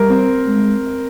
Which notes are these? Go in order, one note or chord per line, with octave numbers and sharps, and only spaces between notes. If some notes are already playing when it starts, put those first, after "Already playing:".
Already playing: G3 A#4
C4
G#3